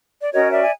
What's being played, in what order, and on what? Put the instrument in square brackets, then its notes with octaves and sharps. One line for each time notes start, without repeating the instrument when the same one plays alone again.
[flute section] D5
C#4 F#4 A#4 C#5 D#5
D5 E5
G#5